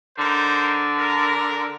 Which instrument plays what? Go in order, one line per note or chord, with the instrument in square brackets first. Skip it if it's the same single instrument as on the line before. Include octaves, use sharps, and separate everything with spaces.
[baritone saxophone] D3 [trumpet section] D#4 A#4 C5
[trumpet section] A#4